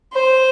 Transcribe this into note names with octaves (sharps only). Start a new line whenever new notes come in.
C5